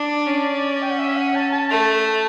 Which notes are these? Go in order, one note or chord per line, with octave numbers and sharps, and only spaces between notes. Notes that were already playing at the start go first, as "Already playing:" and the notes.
Already playing: D4 D5
C#4
G5
F#5
E5
F#5
A5
A5
A3